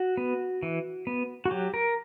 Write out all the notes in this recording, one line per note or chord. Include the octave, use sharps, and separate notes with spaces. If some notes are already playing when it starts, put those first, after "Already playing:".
Already playing: F#4
B3
E3
B3
F#4
F#3 G4
A#4